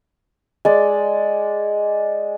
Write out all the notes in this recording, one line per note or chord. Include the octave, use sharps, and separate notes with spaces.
G#3 D5